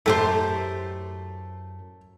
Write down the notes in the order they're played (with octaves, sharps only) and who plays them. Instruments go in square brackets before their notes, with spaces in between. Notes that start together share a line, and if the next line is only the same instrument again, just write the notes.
[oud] F#2 G4 C5 [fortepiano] A3